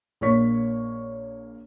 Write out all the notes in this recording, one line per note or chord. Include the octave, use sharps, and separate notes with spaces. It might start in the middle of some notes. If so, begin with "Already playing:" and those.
A#1 A#3 C#5 C#6 B6